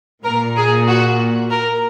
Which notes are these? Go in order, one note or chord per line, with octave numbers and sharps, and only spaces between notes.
A#2 A#4
G#4
F#4
A#4